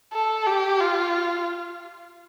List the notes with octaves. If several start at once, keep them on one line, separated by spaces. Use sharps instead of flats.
A4
G4
F4